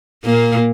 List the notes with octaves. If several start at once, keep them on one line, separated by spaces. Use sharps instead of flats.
A#2 A#3